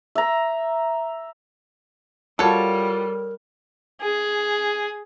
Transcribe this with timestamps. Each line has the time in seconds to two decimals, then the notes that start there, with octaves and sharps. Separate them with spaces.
0.15 E5 A#5
2.39 G3 F4 F#4 A4 A#4 C#5
4.01 G#4